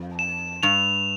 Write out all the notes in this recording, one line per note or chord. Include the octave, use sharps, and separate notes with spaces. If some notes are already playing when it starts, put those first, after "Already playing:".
Already playing: F2
E7
G2 F7